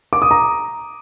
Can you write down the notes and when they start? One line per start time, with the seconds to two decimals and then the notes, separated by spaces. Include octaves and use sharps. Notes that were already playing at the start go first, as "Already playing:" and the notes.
0.13 D6
0.22 D#6
0.31 A#5